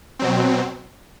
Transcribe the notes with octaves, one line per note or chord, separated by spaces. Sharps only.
B2 F#3 C4